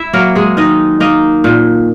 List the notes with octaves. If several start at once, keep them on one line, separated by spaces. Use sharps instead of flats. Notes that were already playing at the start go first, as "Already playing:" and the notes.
Already playing: E4 E5
F#3 A#3 A#4
G#3 G#4
D#3 D#4 D#5
A#3 D#4 D#5
A#2